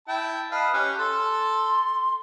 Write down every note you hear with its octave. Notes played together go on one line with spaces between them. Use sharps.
E4 G5 A5
B4 D#5 F5 A5
C#4 G4 F#6
A4 A5 C6